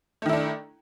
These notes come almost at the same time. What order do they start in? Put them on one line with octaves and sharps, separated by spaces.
A3 D#3 E4 D4